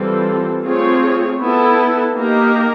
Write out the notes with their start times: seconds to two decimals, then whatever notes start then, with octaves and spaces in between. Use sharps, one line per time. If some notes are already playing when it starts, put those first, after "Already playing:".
Already playing: E3 G3 C4 F4 A4
0.63 A3 C4 F4 G#4 C#5
1.40 B3 E4 A4
2.15 A#3 D#4 G4 A#4